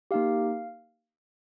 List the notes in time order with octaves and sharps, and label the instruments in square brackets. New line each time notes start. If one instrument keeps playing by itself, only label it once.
[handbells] A#3 D#4 G4 F5